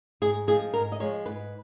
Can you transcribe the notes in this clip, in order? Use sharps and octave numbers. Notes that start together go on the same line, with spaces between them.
G#2 G#4
F3 G#3 G#4
G#2 A#4
D#5
F3 G#3 C#5
G#2 B4